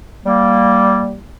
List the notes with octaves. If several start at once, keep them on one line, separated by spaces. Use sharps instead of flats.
G3 A#3